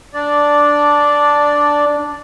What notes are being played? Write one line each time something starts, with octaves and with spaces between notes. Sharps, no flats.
D4 D5